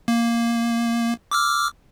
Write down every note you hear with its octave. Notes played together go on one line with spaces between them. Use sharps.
A#3
D6 E6 F6